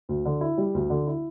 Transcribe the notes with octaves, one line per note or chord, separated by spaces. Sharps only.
D2
D3
E4
G3
D2
D3
E4